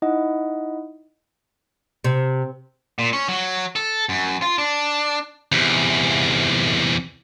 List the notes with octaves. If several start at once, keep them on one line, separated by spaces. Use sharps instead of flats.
D#4 E4 D#5 F#5
C3
A#2
C#4
F#3
A4
F#2
F4
D4
E2 C3